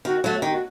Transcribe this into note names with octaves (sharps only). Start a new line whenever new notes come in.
D#3 F#4
F#3 A3 F#4
D#3 G4
F#4